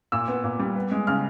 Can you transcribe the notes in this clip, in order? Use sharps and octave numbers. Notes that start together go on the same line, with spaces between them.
A#2 E6
B3
A#2
G3
B3
G#3
C#3 F6